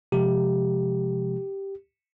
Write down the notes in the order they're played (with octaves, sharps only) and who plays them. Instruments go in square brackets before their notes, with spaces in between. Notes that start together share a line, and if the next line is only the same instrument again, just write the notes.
[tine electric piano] C3 F3 G#3 G4